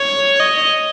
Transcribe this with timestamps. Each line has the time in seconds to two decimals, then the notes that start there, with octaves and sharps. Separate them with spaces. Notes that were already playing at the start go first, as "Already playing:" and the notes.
Already playing: C#5
0.40 D#5